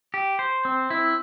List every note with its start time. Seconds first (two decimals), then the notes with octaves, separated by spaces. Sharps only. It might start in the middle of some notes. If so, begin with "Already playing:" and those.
0.14 G4
0.39 C5
0.65 C4
0.90 E4